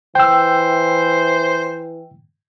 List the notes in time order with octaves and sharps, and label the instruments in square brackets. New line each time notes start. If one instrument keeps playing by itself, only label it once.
[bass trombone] E3 [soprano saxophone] C5 [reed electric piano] G5 E6